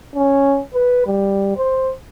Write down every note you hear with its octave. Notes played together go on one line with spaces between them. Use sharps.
C#4
B4
G3
C5